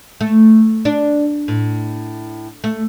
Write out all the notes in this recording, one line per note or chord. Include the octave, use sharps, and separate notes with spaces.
A3
D4
A2
A3